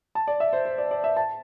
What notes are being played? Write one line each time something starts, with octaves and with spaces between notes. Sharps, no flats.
A5
D5
E5
C5
C5
D5
D5
E5
A5